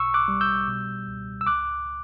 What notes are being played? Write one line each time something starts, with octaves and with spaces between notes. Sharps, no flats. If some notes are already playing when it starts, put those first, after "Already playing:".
Already playing: B1 B2 C#6 E6
D6 F#6
G3
E6 G6
B2
C#2
E6
C#2 D6 F#6